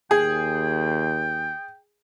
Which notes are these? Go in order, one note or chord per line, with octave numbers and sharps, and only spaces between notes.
D#2 G#4 G5